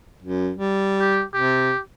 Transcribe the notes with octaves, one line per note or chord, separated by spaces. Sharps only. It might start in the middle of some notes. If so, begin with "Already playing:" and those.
F#2
G3
G4
C3 G4